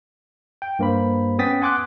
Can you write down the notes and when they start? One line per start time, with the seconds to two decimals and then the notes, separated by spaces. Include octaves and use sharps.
0.62 G5
0.79 G2 A#3 C5 B5
1.39 B3 C#4 G5 D#6 A6 B6
1.62 F#5 G#5 C6 D6 D#6 F#6